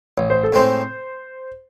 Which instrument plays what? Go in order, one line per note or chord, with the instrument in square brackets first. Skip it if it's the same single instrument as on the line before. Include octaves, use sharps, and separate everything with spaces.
[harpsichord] A1 [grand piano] C#5
[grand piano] C5
A4
[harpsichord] A2 G#3 C4 D#4 [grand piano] C5